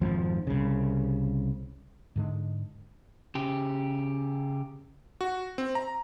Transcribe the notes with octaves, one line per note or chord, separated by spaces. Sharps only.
G#1 F2 F3
C2 C#3
G#2 D3 G#3
C#3 G4
F#4
C4
A#5